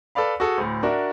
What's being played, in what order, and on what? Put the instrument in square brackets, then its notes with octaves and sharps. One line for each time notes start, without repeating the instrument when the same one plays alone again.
[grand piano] A4 B4 D5 F5 B5
F#4 G#4 A4
D2 A2
D4 F#4 A#4 D5 E5